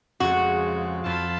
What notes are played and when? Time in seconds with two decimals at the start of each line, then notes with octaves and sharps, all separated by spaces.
0.20 F2 C#3 G#3 F#4
1.06 F2 F4 A5 B5